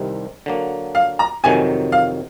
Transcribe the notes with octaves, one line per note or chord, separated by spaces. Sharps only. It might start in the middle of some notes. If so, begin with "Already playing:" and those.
Already playing: C2 C3 D#3 G3 C4
D3 F#3 A#3
F5
A#5
F2 C3 D#3 F#3 G#5
F5